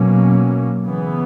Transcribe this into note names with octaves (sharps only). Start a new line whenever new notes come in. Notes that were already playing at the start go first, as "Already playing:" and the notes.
Already playing: B2 F#3 A#3 C#4
C#3 E3 B3